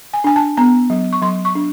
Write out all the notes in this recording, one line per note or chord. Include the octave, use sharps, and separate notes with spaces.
G#5
D4 G#5
A5
B3 A#5
F#3
C#6
F#3 C6
C#6
D4